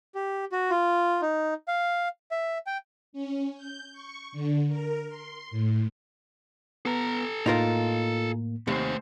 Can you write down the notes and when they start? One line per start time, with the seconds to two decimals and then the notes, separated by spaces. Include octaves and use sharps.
0.15 G4
0.52 F#4
0.70 F4
1.22 D#4
1.68 F5
2.31 E5
2.67 G5
3.13 C#4
3.55 G6
3.92 C#6
4.32 D3
4.68 A#4
5.09 C6
5.51 A2
6.86 B3 A4 A#5
7.46 A2 A#3 D#4 F4 A#4
8.67 D#2 C3 A3 C5